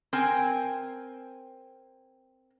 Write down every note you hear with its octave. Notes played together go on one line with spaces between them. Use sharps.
C4 A#4 G5 G#5